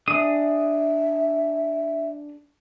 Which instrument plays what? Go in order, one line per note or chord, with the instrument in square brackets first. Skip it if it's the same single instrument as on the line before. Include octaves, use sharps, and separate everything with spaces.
[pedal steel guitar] D4 G#4 D#6 [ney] E5